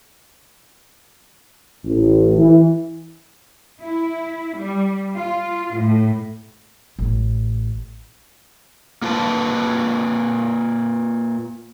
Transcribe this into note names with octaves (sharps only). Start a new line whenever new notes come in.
A1
E3
E4
G3
F4
A2
A1
A#3 F4 B4 A5